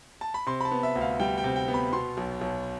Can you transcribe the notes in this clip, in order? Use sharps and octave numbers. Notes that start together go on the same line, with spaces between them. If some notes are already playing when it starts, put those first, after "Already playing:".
A5
B5
C3 C6
B5
A5
B3
E5
D2
F5
G3 G5
G5
C3
G5
B3
B5
B2 C6
B1
B1